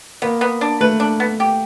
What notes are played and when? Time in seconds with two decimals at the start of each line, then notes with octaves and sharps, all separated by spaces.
0.22 A#3 B3
0.41 B3
0.61 D4
0.81 A3 B4
1.00 D4
1.20 B3
1.40 G4